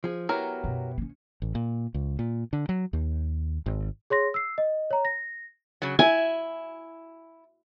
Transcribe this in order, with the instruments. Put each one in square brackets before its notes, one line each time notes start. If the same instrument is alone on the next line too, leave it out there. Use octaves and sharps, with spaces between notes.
[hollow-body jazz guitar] F3 G#4
[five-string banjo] F#3 A#4 [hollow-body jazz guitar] B3 E4 G4
[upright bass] F#2 B2
B3 C#4
[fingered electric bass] A1
A#2
C#2
A#2
D3
F#3
D#2
G#1
[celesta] G#4 C#5 C6 A#6
E6 C7
D#5
C#5 A#5
A#6
[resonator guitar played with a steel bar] C#3 F#3
[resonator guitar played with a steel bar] E4 [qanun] G#5